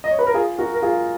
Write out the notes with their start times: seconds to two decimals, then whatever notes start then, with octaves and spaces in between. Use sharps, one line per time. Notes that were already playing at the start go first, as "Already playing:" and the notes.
0.04 D#5
0.11 C#5
0.19 B4
0.27 A#4
0.34 F4 G#4
0.58 F#4 A#4
0.74 A#4
0.82 F4 G#4